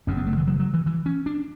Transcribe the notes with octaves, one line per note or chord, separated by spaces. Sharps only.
F#1 F#2 C#3 C#4
B3
A3
E3
F#3
F#3
E3
E3
C#4
D4